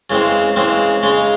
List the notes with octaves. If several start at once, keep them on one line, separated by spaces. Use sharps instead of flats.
C#3 E3 G#3 C4
C#3 E3 G#3 C4
C#3 G#3 D#4